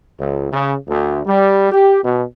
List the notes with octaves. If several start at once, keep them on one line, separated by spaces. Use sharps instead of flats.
C#2
C#3
D2
G3
G4
B2